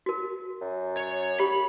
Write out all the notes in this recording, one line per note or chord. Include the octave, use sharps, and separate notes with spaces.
F#4 A#4
F#2
C#5
G4 B5